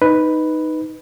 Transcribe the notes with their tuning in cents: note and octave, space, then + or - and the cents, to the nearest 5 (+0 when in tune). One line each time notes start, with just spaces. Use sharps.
D#4 +0 B4 +0